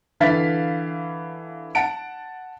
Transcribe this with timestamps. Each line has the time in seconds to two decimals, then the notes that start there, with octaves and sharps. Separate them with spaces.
0.20 D3 E3 F5 A6 B6
1.75 F#5 A5 D7